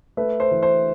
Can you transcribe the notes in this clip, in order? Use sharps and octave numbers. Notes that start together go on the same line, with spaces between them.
A3 B4
C5
E3
C5